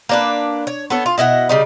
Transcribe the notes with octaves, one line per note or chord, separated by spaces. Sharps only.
A#3 D4 B4
C#5
B3 A4 C#5
F4
B2 E4 D#5 F#5
C#3 G3 D#4